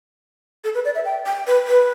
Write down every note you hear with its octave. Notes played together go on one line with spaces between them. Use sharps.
A4
B4
D5
E5
G5
G5
B4
B4